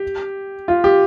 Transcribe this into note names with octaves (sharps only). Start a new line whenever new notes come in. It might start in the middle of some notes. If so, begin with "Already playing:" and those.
Already playing: G4
F4
G4